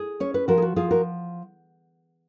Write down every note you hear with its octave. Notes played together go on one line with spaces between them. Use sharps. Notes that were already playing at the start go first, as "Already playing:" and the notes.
Already playing: G#4
C#4 C#5
B4
F3 F#4 A#4
G#4
F#4
F3 F4 G#4
F#4 A#4